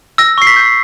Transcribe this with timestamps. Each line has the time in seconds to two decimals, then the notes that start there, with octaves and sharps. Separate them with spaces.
0.18 E6 A#6
0.38 C#6 C7
0.47 B6
0.56 G6